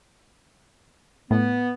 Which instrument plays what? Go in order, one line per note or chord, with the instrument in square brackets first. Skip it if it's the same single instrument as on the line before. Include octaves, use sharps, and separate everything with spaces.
[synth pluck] A2 [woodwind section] B3